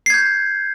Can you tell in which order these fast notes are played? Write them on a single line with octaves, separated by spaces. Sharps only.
C7 G#6 G6